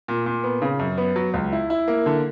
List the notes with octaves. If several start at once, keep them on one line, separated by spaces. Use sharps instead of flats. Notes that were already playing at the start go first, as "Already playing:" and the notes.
A#2
A#2
B3
C#3
F#2
B3
F#3
C#2
E4
E4
A#3
D3